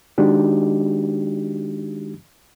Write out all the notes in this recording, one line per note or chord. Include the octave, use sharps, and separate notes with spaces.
D#3 G#3 D4 D#4 F#4 G4